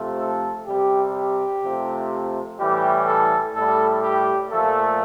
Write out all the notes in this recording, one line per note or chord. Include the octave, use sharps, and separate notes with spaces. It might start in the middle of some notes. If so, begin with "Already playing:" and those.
Already playing: C3 F3 A3
A4
C3 G3 G4
G4
C3 F3 A3
A2 E3 G3 G4
A4
A2 G3 A4
G4
A#2 F3 A3 A4